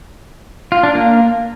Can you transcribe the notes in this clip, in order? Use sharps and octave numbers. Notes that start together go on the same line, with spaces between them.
F4
D4
A#3